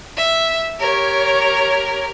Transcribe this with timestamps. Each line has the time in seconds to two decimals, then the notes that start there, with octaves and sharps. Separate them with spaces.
0.17 E5
0.80 G4 A#4 C#5